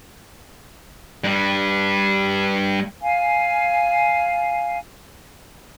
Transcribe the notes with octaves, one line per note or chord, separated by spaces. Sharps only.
G2 G3
F5 G#5